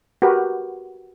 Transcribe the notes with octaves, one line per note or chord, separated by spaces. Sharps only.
F#4 G4 A#4 B4